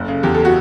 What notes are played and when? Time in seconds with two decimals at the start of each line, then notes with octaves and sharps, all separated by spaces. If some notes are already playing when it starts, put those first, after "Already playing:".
Already playing: F#1 A4
0.08 C#3
0.23 E2 G4
0.35 A4
0.45 F#4